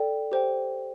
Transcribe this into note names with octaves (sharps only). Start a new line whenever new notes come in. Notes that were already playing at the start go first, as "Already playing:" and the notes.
Already playing: A4 D5 G5
G4 C5 G5